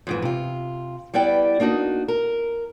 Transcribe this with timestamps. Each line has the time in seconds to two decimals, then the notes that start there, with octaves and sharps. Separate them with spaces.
0.07 F2 G#2 E3
0.22 C3 F4
1.14 G3 B3 E4 D5 G5
1.60 A#3 D4 D#4 F#4
2.08 A#4